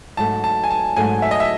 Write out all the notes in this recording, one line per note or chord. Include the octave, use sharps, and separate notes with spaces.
G#2 F#3 A3 A5
A5
G#5
A5
G#2 F#3 A3 G#5
E5
D#5
E5